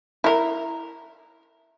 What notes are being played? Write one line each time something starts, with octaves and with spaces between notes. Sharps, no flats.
E4 A#4